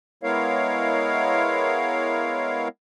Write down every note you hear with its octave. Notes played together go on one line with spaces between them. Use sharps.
G#3 B3 E4 A#4 C#5 F5